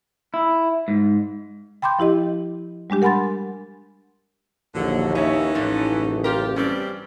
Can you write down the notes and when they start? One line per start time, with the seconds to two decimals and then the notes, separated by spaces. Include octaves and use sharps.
0.34 E4
0.88 G#2
1.82 G5 B5 C6 D6 G6
1.99 F3 E4 G4 D#5
2.90 G3 G#3 D4 G4
3.02 A#4 F#5 G#5 B5 C6 A6
4.75 A#1 D#2 D3 F#3
5.15 E3 C#4 D#4 C#5 E5
5.55 A1 F3 A3 D4
5.90 F#1
6.24 F4 G4 A#4
6.56 G2 G3 C4 C#4 D5